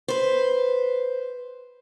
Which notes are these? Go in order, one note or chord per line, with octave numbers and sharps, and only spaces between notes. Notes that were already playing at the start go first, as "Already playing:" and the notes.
B4 C5